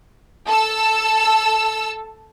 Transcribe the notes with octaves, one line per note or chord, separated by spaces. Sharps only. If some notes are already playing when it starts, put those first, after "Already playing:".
A4 A5 E6